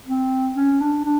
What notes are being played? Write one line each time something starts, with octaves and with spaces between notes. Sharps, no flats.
C4
C#4
D4
D4